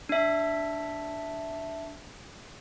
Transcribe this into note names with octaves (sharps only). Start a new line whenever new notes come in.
D4 E5